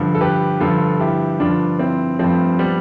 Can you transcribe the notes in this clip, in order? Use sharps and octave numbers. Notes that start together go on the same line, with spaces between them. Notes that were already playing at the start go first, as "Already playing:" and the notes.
Already playing: G2 D3 F3
A4
G4 B4
G2 D3 F3 F4 A4
E4 G4
G2 D3 F3 D4 F4
C4 E4
G2 F3 A3 C4
G3 B3